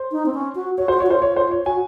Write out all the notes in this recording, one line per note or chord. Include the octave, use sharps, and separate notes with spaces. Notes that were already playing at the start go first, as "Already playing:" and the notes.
Already playing: C5
D#4
C4
C#4
F#4
F#4 C#5
C5
F#4
C#5
F4 C5
C#5
C5
C#5
F#4 G#5